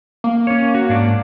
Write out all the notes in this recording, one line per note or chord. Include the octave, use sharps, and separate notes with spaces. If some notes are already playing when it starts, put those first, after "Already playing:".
A#3
C#4 C#5
F#4
G#2 D4 D5